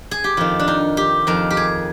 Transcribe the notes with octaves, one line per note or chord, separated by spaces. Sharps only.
G#4
G4
F2 D#3 F4
D4
D#4
G4
F2 D#3 A#4
G4
G#4